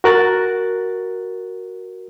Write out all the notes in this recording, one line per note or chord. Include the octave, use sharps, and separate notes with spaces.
F#4 A#4 F#6 A6